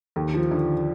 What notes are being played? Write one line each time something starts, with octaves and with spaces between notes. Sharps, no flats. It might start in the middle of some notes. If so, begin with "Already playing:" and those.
D#2
F3
D3